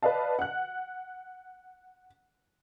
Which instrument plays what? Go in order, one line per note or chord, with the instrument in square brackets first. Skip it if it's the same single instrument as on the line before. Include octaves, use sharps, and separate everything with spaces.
[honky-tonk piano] B4 D5 D#5 F5 A5
F#5 F#6